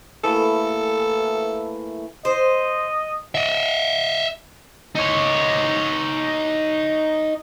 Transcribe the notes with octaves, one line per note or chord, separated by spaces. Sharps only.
E3 A3 A#3 A4
C5 D#5
D#5 E5
D#4 C#5